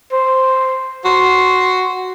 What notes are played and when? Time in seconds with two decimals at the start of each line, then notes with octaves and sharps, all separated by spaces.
0.12 C5
1.05 F#4 C6